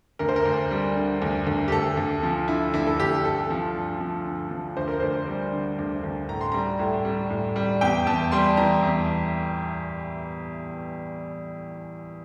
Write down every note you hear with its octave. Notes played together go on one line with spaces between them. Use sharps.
D2 A#4
C5
A#4
D2
G3
D3
D2
D2
G4
D2 A4
D2
F3
D3 E4
D2 E4
A4
D2 G4
G2 A4
F3
G2
F3
G2
F3
D2 C5
A#4
D2 C5
G3
D3
D2
D2
A2 A#5
C6
G3 A#5
A2
G3
A2
G3
E2 G5
E2 A5
G3 C6
E3 A#5
E2